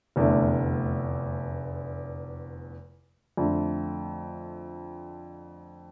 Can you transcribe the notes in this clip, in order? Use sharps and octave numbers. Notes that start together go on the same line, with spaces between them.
F1 E2 D3 A3
F2 D3 A3